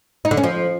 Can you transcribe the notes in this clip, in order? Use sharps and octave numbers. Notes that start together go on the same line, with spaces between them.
D#4
D3
C#4
F3